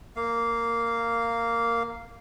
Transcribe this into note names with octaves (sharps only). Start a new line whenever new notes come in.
A#3 F5